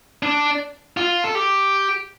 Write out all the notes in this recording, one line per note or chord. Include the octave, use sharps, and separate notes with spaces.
D4
F4
A4
G4